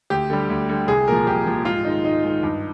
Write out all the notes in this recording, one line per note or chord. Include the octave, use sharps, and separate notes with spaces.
D2 G4
D3 G3
D2
D3 G3
C2 G#4
A#2 F3 A#4
C2 G4
A#2 F3
G#2 F4
D#3 G#3 D#4
G#2 D#4
D#3 G#3
G2